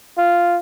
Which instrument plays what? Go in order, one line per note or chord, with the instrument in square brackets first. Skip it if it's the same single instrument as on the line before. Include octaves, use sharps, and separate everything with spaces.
[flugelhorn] F4